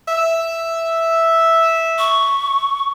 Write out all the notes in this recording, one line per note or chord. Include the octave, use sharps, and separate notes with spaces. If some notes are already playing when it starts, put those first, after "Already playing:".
E5
C#6